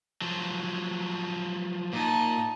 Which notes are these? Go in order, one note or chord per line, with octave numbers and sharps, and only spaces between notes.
F3 F#3
A#2 D#4 A5